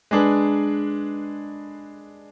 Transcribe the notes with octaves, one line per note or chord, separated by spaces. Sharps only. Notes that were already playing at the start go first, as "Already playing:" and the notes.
G#3 D4 G#4 B4